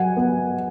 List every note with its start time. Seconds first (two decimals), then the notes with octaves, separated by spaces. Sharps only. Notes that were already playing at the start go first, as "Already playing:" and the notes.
Already playing: F#3 F#5 G#5
0.17 B3